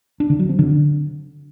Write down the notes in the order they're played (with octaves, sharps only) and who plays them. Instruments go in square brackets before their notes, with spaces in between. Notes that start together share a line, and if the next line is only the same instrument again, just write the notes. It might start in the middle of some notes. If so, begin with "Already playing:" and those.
[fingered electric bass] D4
D3
F#3
C4
D3